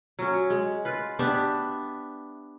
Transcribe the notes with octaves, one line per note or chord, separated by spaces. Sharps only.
F#3 C#4
G#3
F4 B4
B3 D4 G4 E5